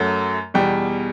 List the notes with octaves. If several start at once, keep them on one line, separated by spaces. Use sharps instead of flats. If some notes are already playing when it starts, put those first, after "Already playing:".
Already playing: F#2 F#3 A3
E2 B2 G3 G5